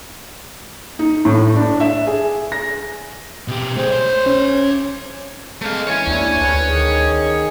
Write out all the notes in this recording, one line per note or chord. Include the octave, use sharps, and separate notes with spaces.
D#4
A2
D4
E5
G#4
A#6
B2 G4
A3 G#4 C5
C#5 C6
C#4
G#3 A3 F5
E3 C#5 G#5
D#2 D4 E4
D2 B4
D#3 G#4